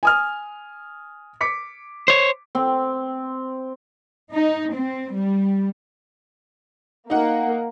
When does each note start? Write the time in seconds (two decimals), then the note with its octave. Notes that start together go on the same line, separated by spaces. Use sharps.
0.03 G#5 D#6 F6
1.41 D6 B6 C#7
2.08 C5 C#5
2.55 C4
4.32 D#4
4.74 C4
5.13 G3
7.10 A#3 D#4 F#5